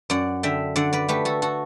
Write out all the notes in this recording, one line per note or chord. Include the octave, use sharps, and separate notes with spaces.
F#2 D5 F#5
D3 E5 G5
D3 D5 F#5
B4 D5
A3 G4 B4
F#4 A4
F#4 A4